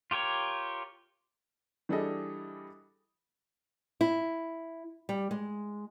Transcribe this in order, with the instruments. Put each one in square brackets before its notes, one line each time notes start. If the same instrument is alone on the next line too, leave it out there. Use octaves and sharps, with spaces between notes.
[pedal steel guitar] F4 G4 A#4 C#5
[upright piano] E3 G3 D4 G#4 A4 D#5
[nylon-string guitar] E4
G3
G#3